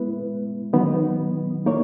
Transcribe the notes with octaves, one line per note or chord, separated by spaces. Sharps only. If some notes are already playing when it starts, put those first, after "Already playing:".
Already playing: G#3 B3 E4 B4
D#3 F#3 B3 D#4
A#3 D#4 A#4 C#5